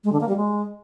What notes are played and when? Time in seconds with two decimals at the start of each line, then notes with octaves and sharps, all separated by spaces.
0.04 G#3
0.12 D3
0.20 A#3
0.29 G3
0.37 G#3